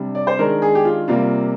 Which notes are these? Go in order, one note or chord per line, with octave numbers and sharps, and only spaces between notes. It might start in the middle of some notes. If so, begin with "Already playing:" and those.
Already playing: C3 G3 D4
D5
C5
D#3 G#3 D4 A#4
G#4
G4
F4
C3 G3 A#3 F4